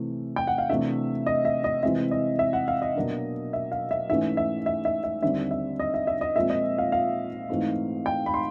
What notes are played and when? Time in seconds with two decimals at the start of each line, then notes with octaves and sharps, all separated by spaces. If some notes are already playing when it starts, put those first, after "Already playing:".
Already playing: C3 E3 A3
0.36 G5
0.47 F#5
0.58 F5
0.70 C3 E3 A3 D4 E5
1.26 D#5
1.45 E5
1.64 D#5
1.83 C3 E3 G#3 C4 E5
2.11 D#5
2.39 E5
2.53 F#5
2.68 F5
2.82 D#5
2.96 B2 F#3 A#3 D4
3.53 E5
3.72 F5
3.91 E5
4.10 G#2 E3 A3 C#4 E5
4.37 E5
4.66 E5
4.85 E5
5.04 E5
5.22 D#2 D3 G3 C4 E5
5.51 E5
5.79 D#5
5.94 E5
6.07 E5
6.21 D#5
6.36 A#2 F3 G#3 C4 E5
6.50 D#5
6.78 F5
6.92 F5
7.49 G#2 E3 A3 C4
8.06 G5
8.26 B5
8.34 C6